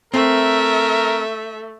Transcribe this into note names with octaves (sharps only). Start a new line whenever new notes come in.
A3 C4 A#4 E5